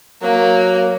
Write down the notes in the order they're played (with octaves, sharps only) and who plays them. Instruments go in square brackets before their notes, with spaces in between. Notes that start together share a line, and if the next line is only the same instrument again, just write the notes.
[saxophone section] F#3 [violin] A#3